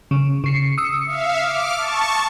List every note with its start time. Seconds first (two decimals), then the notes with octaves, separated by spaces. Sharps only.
0.11 C#3
0.44 C#3 C7 C#7
0.78 D#6 E6 C#7
1.06 E5 F5
1.42 D6 F6
1.75 A5 C#6